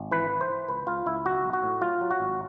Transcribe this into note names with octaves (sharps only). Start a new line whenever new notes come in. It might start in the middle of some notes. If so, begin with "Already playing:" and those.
Already playing: G#1
E3 B4
E3
C5
E3
C#2 B4
C#2 F4
C#2 E4
B1 F#4
B1
F#4
A2
F#3 F4
F#3
F#4
G#1